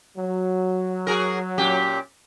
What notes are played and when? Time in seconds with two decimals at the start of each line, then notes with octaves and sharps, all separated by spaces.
0.18 F#3
1.07 F#4 G#4 A#4
1.58 A#2 C#4 G4